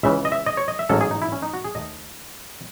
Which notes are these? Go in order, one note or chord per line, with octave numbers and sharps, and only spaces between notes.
C#2 C#3 E3 E5
D#5
E5
D#5
C#5
D#5
E5
A1 G#2 F#3 C#4 A4
G#4
D#4
E4
C#4
D#4
F#4
G#4
D#2 D#3 A3 D#5